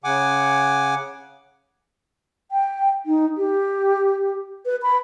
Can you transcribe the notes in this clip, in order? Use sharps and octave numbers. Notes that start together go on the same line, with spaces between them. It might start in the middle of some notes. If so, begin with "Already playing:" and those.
C#3 F#5 G#5 D6
G5
D#4
G4
B4
B5